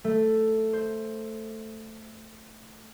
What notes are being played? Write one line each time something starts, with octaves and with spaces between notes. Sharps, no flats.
A3
C5